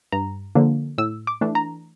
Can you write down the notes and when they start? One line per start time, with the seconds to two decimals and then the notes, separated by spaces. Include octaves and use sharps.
0.12 G2 A#5
0.55 D3 F3 A#3 D4
0.98 A2 E6
1.27 D6
1.41 E3 A3 D4
1.55 A#5